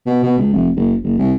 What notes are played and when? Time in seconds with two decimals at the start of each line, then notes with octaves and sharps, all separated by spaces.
0.06 B2
0.23 B2
0.38 C#2
0.53 F1
0.76 F#1
1.03 F#1
1.19 C2